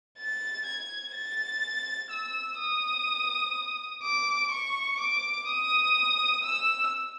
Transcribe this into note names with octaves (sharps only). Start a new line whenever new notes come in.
A6
G#6
A6
E6
D#6
D6
C#6
D6
D#6
E6